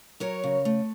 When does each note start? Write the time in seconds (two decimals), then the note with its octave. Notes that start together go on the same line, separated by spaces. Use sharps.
0.20 F#3 A#4 C#5
0.44 C#3
0.65 A3